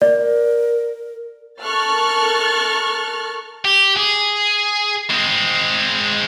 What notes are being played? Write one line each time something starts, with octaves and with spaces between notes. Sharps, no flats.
A#4 D5
A4 A#4 C#6 F6 F#6 A6
G4
G#4
G#3 C4